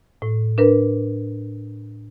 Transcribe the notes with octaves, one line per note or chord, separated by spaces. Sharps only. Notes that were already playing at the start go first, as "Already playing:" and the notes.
A2
D4 A#4 B4